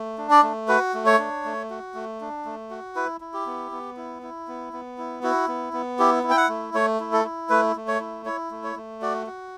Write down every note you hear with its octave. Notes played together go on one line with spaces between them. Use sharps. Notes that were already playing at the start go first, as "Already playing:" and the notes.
Already playing: A3
D4
D5
A3
F#4 B4
A3
C#5
D4
A3
F#4
A3
D4
A3
F#4
E4 B4
E4
G4
B3
B3
E4
E4
B3
B3
E4
E4 F#4
B3
B3
E4 G4
E4
G5
F#5
A3
A3 C#5
E4
A4
E4
A3 B4
A3
C#5
E4
E4 C#5
A3
C#5
A3
F#4 D5
F#4